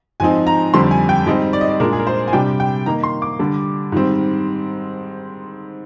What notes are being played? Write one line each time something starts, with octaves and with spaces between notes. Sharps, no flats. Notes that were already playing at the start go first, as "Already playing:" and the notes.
G#2 F3 C4 D#4 G#5
A#5
F2 D3 G3 C4 C6
G#5
G5
G#2 G3 C4 D#4 D#5
D5
D#5
D5
A#2 G#3 D4 A#4
G#4
A#4
C5
G#5
C3 G3 D4 G5
G5
D#3 A#3 D#4 A#5
C6
D6
D3 G3 D4
G#2 D#3 G3 C4